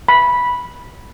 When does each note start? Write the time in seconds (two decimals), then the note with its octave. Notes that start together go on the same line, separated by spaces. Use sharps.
0.08 B5